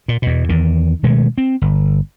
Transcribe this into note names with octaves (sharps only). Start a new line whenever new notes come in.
A#2
E2 B2
E2 D#3
B2 D#3 G#3 A3
C4
G1